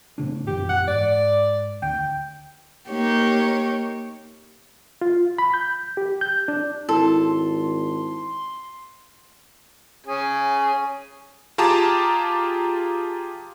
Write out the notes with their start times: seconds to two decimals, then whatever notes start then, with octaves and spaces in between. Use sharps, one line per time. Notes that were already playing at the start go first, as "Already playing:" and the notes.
0.18 A2 C#3 D4
0.47 A#1 F#2 E3 G4
0.69 F#5
0.88 G#2 D5
1.82 D2 G5
2.90 A#3 D#4 G4 C#5
5.01 F4
5.38 B5
5.54 G6
5.97 G4
6.21 G6
6.48 D4
6.89 G#1 E4 A4 C6
10.06 C#4 G#4
11.58 F4 G4 G#4 A5 A#5 D6